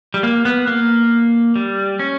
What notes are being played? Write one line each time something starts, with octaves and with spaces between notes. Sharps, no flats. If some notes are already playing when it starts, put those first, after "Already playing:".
G3
A#3
B3
A#3
G3
C#4